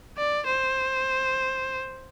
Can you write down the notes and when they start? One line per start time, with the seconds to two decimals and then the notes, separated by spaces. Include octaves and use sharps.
0.18 D5
0.47 C5